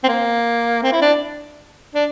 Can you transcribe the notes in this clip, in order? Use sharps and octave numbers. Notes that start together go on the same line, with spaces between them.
C4
A#3
C4
E4
D4
D4